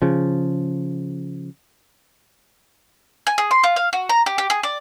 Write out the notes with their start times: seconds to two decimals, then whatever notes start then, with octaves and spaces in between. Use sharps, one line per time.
0.02 C#3 F3
3.27 G#5
3.38 G#4
3.51 C6
3.64 F4
3.76 F5
3.93 F#4
4.09 A#5
4.26 G4
4.38 G4
4.50 G#4
4.63 D5